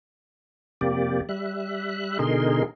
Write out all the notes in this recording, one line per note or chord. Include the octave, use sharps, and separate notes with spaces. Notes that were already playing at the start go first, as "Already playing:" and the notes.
F2 C3 A#3 G4 D5
G3 E5 F#6
B2 D3 D#4 G#4 A#4 C6